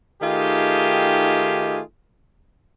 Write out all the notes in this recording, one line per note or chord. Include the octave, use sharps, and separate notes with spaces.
D#3 A3 D#4 F4 G4 G#4